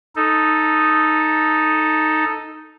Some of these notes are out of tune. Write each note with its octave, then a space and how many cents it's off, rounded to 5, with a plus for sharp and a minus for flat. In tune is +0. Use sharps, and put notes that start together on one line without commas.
D#4 +0 A4 +0